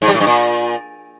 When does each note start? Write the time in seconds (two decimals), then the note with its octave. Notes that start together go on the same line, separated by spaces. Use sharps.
0.02 G#2
0.08 G3
0.14 A2
0.20 G2
0.27 A#2